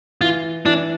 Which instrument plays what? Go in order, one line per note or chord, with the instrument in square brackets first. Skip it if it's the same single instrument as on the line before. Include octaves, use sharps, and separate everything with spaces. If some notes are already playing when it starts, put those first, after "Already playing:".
[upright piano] E3 [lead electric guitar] F4
[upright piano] E3 [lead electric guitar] D4